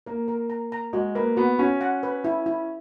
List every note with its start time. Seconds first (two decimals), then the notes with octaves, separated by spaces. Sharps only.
0.06 A#3 A#4
0.28 A#4
0.50 A#5
0.72 A#5
0.93 G#3 F#4
1.15 A#3 B4
1.37 B3 F#4
1.59 C#4 F#4
1.81 F#5
2.03 B4
2.24 E4
2.46 E4